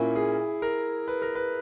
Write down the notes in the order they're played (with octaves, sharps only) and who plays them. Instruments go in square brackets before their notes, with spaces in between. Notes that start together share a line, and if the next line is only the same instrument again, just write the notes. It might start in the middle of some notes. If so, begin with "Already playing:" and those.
Already playing: [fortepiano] A#2 A#3 C#4 [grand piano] E4
[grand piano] G#4
A#4
B4
A#4
B4